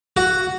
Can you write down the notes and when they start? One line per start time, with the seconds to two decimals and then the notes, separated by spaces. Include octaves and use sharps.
0.17 F#4